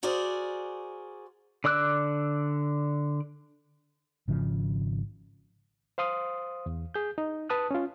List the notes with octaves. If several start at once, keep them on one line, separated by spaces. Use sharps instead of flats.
F#4 G#4 A#4 C5 D5
D3 D5 D6 E6 F#6
G#1 C#3 F3
C5 F5 C6 D#6
E2
G#4 G6
D#4
B4 A5 D#6 F#6
C#4 F4